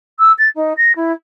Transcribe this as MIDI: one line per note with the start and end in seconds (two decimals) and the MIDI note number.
0.19 0.32 88
0.38 0.48 93
0.55 0.73 63
0.77 0.92 94
0.96 1.12 64